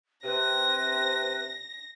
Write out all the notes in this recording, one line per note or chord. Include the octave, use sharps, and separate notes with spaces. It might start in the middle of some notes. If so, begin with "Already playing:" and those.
C3 B4 A#6